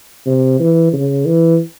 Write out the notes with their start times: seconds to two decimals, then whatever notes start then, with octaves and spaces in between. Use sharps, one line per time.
0.26 C3
0.60 E3
0.93 C#3
1.26 E3